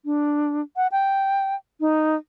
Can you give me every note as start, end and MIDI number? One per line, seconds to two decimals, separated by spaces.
0.05 0.61 62
0.76 0.87 78
0.92 1.55 79
1.80 2.15 63